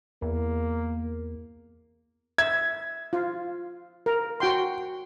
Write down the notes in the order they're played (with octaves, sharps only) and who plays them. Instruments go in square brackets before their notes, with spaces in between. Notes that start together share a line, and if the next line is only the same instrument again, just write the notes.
[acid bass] E2 [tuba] A#3
[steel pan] E5 [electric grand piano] G#6
[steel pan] F4
A#4
F#4 G5 C6